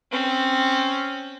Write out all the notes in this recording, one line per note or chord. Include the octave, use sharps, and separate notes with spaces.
C4 C#4